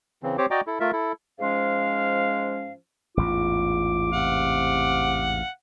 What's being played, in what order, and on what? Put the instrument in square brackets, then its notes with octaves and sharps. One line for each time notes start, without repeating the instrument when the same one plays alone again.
[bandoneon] C#3 E3 C4
C4 G4 C5 C#5 D6
F#4 D5 D#5 G5 A#5 D6
E4 A4
A3 F4 A#4 E5
E4 A4
[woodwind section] G#2 F3 G#3 C#4 F5
[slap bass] A1 E2 G#2 [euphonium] F4 [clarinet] D6
[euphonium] C3 [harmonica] F5 F#5